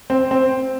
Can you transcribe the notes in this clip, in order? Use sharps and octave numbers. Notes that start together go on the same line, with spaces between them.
C4
C4